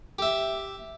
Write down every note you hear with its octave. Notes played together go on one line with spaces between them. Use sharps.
G4 E5